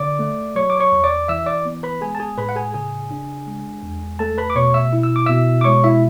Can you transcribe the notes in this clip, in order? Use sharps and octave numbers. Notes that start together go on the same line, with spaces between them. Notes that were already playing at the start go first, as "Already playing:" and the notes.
Already playing: D3 D5 D6
A3
F#3 C#5 C#6
D6
C#5 C#6
E2
D5 D6
E3 E5 E6
D5 D6
B3
B4 B5
G#3 G#4 G#5
A5
G#4 G#5
A2 B4 B5
F#5
G#4 G#5
C#3 G#4 G#5
D4
G#3
E2
A3 A4 A5
B4 B5
D6
B2 C#5 C#6
E5 E6
E4
E6
D6
B2 E5 E6
D6
G#3 C#5 C#6
E4 E5